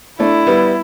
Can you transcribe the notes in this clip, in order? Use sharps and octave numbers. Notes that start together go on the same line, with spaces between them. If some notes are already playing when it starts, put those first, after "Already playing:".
A3 D4 E4
G3 B3